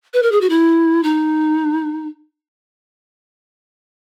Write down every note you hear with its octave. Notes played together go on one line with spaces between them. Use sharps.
B4
A#4
G#4
F#4
E4
D#4